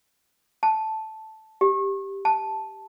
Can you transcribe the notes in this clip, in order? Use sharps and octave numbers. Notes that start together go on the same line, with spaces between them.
A5
G4
A5